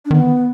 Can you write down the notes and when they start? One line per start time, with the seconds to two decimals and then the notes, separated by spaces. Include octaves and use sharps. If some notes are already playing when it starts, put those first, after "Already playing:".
0.05 D4
0.11 D#3 B3